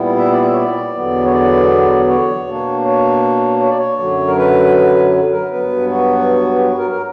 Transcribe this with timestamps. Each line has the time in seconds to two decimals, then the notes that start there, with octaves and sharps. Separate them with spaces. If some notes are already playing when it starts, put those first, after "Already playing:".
Already playing: A#2 G3 B3 E4
0.18 E5
0.31 D5
0.42 E5
0.52 C#5
0.57 D5
0.95 E2 D3 F#3 B3
1.25 C#5
1.33 D5
2.09 C#5
2.47 B2 A#3 D4
2.85 C#5
3.61 C#5
3.70 D5
3.78 C#5
3.99 F#2 D3 F#3
4.27 A#4
4.38 B4
5.32 A#4
5.51 G2 F#3 B3 B4
5.89 F#4
6.56 G4
6.65 F#4
6.78 A#4
6.91 A#4